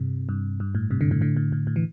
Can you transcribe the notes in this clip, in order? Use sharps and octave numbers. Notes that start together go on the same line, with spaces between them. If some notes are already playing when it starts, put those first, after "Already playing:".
Already playing: G2 C3
G2
G2
A2
G2 C3
A2 D3
A2 D3
A2 D3
A2
A2
A2
E3